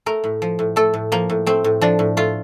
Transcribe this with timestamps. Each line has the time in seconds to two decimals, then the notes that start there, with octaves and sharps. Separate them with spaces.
0.06 A3 A#4
0.24 A2
0.42 F3
0.59 A2
0.76 A3 A4
0.94 A2
1.12 F3 A#3
1.30 A2
1.46 A3 C4
1.64 A2
1.81 F3 D4
1.99 A2
2.17 A3 F4